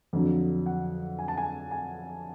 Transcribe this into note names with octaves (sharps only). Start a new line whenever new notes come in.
F2 D3 F#3
F#5
G#5
A5
G#5
G#5